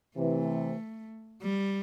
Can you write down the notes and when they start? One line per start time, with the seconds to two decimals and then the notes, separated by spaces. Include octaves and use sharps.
0.16 C3 E3 A3
1.42 G3